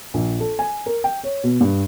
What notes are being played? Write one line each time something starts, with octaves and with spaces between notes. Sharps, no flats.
A#1
A4
G#5
A#4
G5
C#5
B2
G2